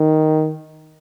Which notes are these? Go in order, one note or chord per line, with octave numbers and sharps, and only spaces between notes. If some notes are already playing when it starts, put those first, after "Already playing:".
Already playing: D#3